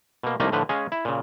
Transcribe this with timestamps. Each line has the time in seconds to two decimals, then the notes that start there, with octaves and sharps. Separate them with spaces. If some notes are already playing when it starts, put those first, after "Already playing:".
0.23 B2 A#3
0.40 C2 F3 A3 A#3 D#4 D5
0.52 A2 D3 F3 B4
0.69 G#3 C#4 G#4 D#5 F5
0.92 E4
1.05 A#2 C#3